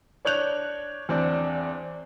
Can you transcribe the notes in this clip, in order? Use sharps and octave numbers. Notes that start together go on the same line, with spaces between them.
D4 C#5 F#6 G6 F7
E2 C4 D4